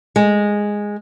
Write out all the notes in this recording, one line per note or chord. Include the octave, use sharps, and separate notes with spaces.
G#3